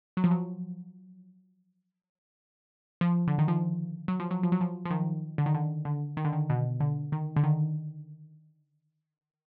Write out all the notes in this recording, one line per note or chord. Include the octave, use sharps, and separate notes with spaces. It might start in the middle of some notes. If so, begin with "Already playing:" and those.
F#3
F3
F#3
F3
D3
D#3
F3
F#3
F3
F#3
F3
F#3
F3
F3
D#3
D3
D#3
D3
D3
D#3
D3
D#3
B2
D3
D#3
D3
D#3